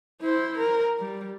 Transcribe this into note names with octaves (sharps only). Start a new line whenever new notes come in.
E4 C5
A#4
G3